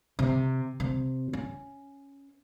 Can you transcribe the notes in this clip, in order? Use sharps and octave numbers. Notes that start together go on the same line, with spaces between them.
C3
C3
C#4